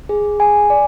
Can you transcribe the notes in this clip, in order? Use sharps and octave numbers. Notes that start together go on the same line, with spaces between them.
G#4
G#5
D5